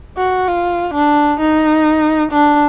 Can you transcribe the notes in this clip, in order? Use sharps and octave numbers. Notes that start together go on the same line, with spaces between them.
F#4
F4
D4
D#4
D4